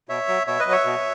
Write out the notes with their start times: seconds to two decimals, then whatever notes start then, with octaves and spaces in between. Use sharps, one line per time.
0.09 B2 C#5 E5
0.28 F#3
0.47 B2 C#5 E5
0.59 B4 D#5
0.66 F#3
0.72 C#5 E5
0.85 B2